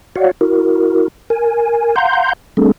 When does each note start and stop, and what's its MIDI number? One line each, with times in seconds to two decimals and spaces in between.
0.16 0.31 66
0.16 0.31 73
0.16 0.31 74
0.16 0.31 77
0.16 0.31 78
0.41 1.08 64
0.41 1.08 66
0.41 1.08 70
1.30 1.95 70
1.30 1.95 80
1.96 2.33 77
1.96 2.33 78
1.96 2.33 82
1.96 2.33 84
1.96 2.33 91
2.57 2.71 55
2.57 2.71 57
2.57 2.71 60
2.57 2.71 62
2.57 2.71 68
2.57 2.71 69